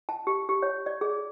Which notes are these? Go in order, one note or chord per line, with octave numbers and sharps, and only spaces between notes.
A5
G4
G4
C#5
D5
G#4